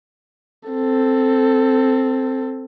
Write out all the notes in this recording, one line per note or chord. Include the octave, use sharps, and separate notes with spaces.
C4 A4